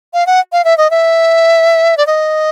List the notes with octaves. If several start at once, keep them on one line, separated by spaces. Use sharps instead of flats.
F5
F#5
F5
E5
D#5
E5
D5
D#5